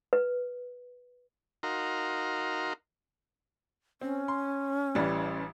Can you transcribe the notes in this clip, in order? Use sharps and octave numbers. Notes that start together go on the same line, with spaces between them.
B4
D#4 F#4 A#4 F5 A#5 C6
C4 C#4
C6
A1 E3 G3